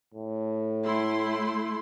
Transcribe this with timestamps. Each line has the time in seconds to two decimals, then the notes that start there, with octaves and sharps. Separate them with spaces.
0.14 A2
0.84 A3 E4 C6